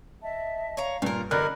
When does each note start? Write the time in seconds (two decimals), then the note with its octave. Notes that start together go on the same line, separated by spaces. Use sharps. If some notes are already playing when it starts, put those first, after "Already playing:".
0.23 D#5 E5 A5
0.77 C#5 F5 A#5
1.02 G2 A#2 F4 A#4
1.31 D3 E3 G3 A#4 D#5 B5 F#6